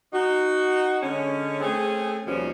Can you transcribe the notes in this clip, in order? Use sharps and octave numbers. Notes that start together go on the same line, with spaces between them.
D#4 F#4
D3 G#3 C#4
A3 C4 C#4 G#4
D#2 B2 F3 G3 C#4